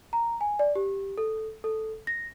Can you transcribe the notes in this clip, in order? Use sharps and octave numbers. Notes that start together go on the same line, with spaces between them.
A#5
G#5
D5
G4
A4
A4
A#6